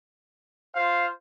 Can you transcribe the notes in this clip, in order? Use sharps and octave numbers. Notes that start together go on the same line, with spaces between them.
F4 C5 F5